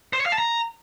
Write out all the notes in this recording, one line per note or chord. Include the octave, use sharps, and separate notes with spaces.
C5
C#5
F5
A5
A#5